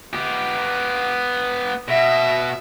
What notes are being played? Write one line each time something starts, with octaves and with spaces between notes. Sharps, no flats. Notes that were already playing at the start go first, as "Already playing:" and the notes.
B3 G4
B2 E5